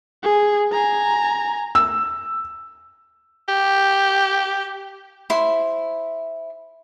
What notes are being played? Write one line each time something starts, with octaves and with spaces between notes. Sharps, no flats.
G#4
G#5 A#5
E6
G4
E4 C5 C6